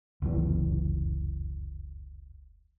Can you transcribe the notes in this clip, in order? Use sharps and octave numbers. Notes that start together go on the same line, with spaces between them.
F1 C#2 F#2 E3